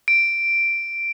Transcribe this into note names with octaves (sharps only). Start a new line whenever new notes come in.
D7